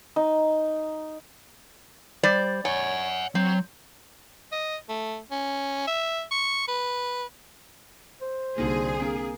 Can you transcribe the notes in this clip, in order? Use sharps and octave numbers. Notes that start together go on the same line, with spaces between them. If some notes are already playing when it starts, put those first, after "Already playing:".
D#4
G3 C5 D5
C#5 F#5 G#5
F#3 C4
D#5
A3
C#4
E5
C#6
B4
C5
C2 D3 A#3 D#4 F#4 G#4
A#3 C4 D4